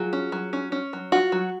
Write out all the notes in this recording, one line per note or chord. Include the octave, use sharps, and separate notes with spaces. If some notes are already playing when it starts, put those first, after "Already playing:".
Already playing: F#3 F4 G#4
C#4
F#3
C#4
C#4
F#3
F4 F#4
F#3